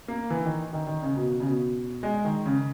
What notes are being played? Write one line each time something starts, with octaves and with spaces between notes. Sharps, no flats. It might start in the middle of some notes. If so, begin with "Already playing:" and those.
A#3
E3
D#3
D#3
D#3
C#3
B2
C#3
B2
G#3
D#3
C#3